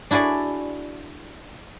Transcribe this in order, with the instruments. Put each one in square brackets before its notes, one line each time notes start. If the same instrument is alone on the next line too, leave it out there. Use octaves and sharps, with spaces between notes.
[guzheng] D4 E4 F#4 G#4 D5